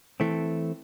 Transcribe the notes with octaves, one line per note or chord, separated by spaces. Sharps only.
E3 A3 C4